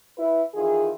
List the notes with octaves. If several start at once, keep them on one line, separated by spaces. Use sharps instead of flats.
E4 B4
D#3 E3 F4 G#4